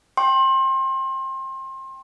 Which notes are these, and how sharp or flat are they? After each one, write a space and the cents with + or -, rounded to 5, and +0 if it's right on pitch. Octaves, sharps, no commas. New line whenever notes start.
G5 +0 C6 +30